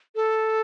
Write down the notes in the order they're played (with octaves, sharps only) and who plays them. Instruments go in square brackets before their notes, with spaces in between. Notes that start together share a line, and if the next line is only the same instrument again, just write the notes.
[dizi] A4